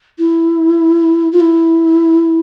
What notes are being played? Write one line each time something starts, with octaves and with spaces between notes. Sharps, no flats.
E4
F4
E4